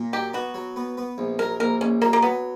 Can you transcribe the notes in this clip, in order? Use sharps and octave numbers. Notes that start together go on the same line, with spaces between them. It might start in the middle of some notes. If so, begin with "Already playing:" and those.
Already playing: A#2
F#3 G4
B3 F#4
F#3
B3
B3
A#1
F#3 A#4
A#1 A#4
A#1 C#4
F#3 A#3
A#3
F#3 B3